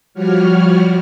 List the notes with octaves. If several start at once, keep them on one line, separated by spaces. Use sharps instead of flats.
F3 G3 F#4 C#5 F6